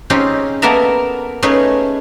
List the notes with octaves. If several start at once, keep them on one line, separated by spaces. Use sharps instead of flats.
C4 C#4 D#4 F4 G4 G#4
A#3 B3 A4 A#4 E5 A#5
A3 C#4 D#4 G#4 B4 C#5